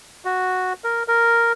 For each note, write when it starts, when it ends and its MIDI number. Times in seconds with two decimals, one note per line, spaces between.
0.25 0.73 66
0.84 1.03 70
1.08 1.52 70